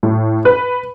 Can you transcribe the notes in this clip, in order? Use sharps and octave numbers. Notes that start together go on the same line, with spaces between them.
A2
B4